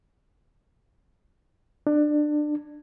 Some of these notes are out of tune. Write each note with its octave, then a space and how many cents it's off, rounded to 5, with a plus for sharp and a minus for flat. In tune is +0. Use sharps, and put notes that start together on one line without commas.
D4 +25